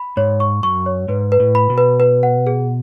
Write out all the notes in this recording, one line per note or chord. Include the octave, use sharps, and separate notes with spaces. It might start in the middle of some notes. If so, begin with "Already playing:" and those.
Already playing: B5
G#2 C#5
C#6
F#2 C#6
C#5
G#2 B4
B4
A2
B5
B2
B4
B4
F#5
G#4